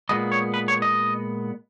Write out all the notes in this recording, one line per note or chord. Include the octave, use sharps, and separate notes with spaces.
A#2 G#3 B3 D#5
C#5
B4
C#5
D#5